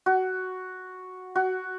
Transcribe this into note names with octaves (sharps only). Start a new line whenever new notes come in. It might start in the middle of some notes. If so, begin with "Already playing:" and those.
F#4
F#4